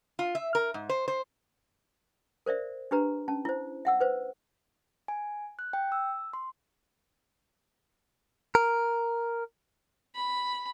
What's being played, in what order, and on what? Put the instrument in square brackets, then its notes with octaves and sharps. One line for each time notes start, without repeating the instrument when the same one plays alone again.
[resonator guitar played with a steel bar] F4
E5
A#4
G#2
C5
C5
[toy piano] A#4 C5 D5 E5
D4 G4 B4 A#5
C#4 A5
E4 C5
E5 F#5 E6
B4 C5
[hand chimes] G#5
F#6
G5
E6
C6
[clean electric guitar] A#4
[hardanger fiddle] B5